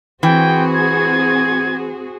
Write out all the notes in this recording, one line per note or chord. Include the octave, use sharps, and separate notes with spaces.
E3 C4 F#4 G#4 G5
G#6